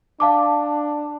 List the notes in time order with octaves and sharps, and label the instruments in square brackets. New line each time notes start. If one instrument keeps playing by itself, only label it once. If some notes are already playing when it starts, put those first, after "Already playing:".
[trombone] D4 [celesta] F5 A5 D6